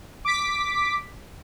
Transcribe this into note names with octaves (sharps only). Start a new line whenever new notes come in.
D6 B6